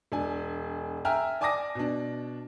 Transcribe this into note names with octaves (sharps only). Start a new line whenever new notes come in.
E1 D4 G#5
E5 G5 G#5 A#5 F6
D5 G#5 A5 D6 D#6 A#6
B2 D4